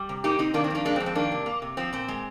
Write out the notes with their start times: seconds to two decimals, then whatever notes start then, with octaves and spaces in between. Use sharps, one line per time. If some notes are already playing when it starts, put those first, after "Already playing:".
Already playing: G3
0.09 C3
0.24 A#3 D#4 G4
0.39 C3 C4 D#4
0.54 D#3 A#3 D4
0.64 C4
0.70 F2 A#3 D4
0.85 G#3 A#3 D4
0.96 C4
1.00 F2
1.06 C4
1.15 D#3 A#3 D4
1.32 C3
1.46 A#3
1.62 C3
1.77 F3 C4
1.93 A#2 C4
2.08 G#3